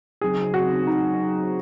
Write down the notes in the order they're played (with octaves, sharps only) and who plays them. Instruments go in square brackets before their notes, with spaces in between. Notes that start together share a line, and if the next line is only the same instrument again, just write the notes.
[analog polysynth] C#3 F#3 C4 D#4 [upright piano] G#4
[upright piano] F#4
D#4